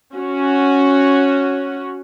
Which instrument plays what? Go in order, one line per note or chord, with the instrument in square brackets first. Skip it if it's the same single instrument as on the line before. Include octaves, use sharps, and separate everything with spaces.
[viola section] C#4 F#4